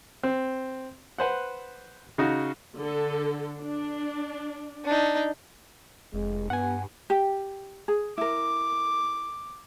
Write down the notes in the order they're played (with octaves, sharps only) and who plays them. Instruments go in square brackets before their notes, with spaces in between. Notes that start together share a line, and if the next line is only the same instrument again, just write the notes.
[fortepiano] C4
B4 C5 F#5
C#3 D#4 F#4
[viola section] D3 A4
D4
[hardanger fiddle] D4 D#4
[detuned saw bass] F1 [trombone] G#3
[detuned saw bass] G2 [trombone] B3 [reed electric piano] F#5 G#5
[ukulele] G4
G#4
[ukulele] E4 A#4 [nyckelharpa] D6